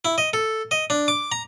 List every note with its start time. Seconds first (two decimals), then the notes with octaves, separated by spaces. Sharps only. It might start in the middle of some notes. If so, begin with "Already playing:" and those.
0.05 E4
0.18 D#5
0.33 A4
0.71 D#5
0.90 D4
1.08 D6
1.32 A#5